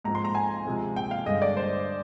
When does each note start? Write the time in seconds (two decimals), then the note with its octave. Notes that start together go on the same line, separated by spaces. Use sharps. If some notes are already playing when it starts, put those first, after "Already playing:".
0.04 G#2 F3 C4 A#5
0.15 C6
0.25 A#5
0.35 G#5
0.65 C3 F3 G#3 C4
0.96 G5
1.11 F5
1.26 G2 D3 G#3 D#5
1.42 D5
1.57 C5